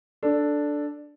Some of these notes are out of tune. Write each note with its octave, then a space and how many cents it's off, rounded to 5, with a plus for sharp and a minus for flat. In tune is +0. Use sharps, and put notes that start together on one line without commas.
D4 +0 A4 +0